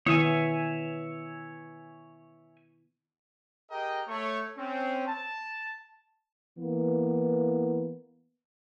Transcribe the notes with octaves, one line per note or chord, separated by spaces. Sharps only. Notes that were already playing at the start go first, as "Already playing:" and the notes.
D#3 B3 E4 C#5 E5 G#5
G4 G#4 A#4 D#5 G5 A#5
A3 C#5
C4 C#4
A5
E3 A#3 B3